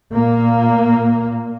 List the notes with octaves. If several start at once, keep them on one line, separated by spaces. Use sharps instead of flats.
A#2 A#3